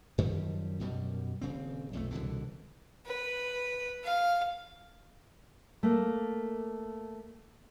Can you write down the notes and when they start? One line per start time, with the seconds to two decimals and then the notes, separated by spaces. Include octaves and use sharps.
0.18 F#2 D#3 F3 G3
0.79 F#2 B2 G3
1.41 D#1 C#3 C4
1.93 B1 F2 G#3 A3
2.11 C2 B2 D3 E3
3.06 B4
4.04 F5
5.83 A3 A#3